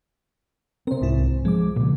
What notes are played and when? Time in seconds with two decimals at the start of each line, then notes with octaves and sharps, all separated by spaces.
0.87 C3 C4 A#4 C5
1.01 C2 G#2 E4
1.45 F3 G#3 D6
1.76 A#2 C#3